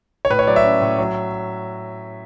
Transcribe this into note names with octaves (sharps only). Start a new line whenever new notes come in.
C#5
A2 B4
C#5
F#3 D5
E5
C#4
A2
F#3